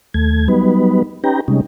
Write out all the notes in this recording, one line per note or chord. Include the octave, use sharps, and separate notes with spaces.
D#2 A3 G#6
F#3 G3 B3 D#4 B4
C#4 D#4 G4 B4 G5 A#5
C3 G3 G#3 C#4 D#4